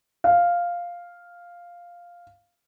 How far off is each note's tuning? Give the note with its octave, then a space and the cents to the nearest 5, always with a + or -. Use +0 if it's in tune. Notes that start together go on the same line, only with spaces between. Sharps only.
F5 +0